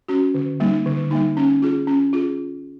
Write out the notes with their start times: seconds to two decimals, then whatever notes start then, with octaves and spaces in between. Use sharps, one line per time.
0.08 C#4 F#4
0.34 D3
0.60 G3 A#3 D#4
0.86 D3
1.11 G3 A#3 D#4
1.37 C#4
1.62 F4 G#4
1.87 C#4
2.13 F4 G#4